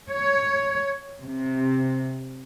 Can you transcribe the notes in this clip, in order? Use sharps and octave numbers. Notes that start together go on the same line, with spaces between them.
C#5
C3